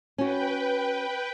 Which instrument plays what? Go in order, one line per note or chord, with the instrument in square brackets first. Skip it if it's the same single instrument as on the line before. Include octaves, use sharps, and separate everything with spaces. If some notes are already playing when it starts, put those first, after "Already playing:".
[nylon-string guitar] C#4 F#4 [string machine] B4 G5